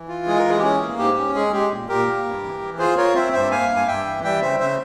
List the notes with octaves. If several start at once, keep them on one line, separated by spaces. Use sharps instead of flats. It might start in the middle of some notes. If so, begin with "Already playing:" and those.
Already playing: E3
F4
G#3 G#4
A#4
E3
G#4
G4
C#4 G#4
A#3
G#2 G4
C#4
G#3 G#4
G#3 G4
A#2
A#2 G4 A#4
A#3
G2
E3
E3
F4 G#4 C5
F4 A#4 C#5
C4 C5 E5
G2 C5 E5
A#3 F5 G#5
G2
G#5
G2 E5 G5
E3
G3 E5 G5
C#3 C5 E5
C#3 C5 E5